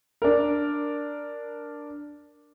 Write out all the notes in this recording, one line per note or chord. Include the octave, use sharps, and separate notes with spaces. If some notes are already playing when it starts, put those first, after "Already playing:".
D4 A#4